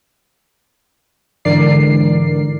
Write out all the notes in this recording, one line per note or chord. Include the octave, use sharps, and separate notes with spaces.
G#2 D3 E3 A#4 D5 C7